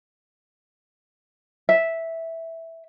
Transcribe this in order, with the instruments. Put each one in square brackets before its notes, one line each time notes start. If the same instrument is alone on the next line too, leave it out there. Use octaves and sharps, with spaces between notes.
[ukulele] E5